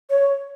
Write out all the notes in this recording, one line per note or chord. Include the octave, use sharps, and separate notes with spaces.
C#5